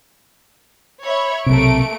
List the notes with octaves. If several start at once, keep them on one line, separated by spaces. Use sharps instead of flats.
C#5 E5 B5
B1 C3 A3 A#3 D7